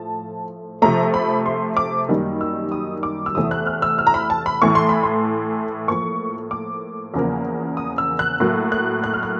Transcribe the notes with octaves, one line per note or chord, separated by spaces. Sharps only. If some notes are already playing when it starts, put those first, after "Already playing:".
Already playing: A2 F3 A3 A5
C3 F3 A3 A#5
B5
C6
D6
F#2 D#3 G3 A#3
E6
D#6
D6
E6
E2 C3 E3 A3 D#6
F#6
F6
E6
F6
A#5
B5
A5
B5
A2 E3 A3 C#6
C6
B5
C6
A2 F3 A#3 C#6
D6
E2 C#3 F3 A#3
D#6
E6
F#6
A2 F#3 A#3
F#6
F#6
F6
F#6